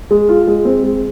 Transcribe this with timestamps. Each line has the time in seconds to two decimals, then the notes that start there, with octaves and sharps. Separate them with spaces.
0.11 G#3
0.29 F4
0.47 G#3
0.65 C4
0.84 G#3